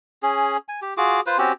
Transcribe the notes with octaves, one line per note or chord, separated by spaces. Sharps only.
C#4 G#4
G#5
G4
F4 F#4 G#4 D6
F4 B4 C5
C4 C#4 F#4 G4